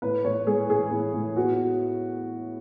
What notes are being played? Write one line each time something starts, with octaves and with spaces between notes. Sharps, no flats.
A2 B4
A2 C#5
G#3 G#4
A2 G#4
A2
A2
B3 F#4